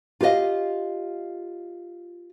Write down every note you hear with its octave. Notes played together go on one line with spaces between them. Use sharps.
F4 G4 B4 D#5 F5